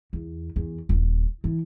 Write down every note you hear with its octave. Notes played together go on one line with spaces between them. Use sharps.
E2
E2
D#1
E3